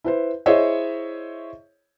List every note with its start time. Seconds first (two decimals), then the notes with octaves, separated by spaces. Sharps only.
0.04 E4 B4 C5
0.46 E4 G#4 C5 C#5 D#5 E5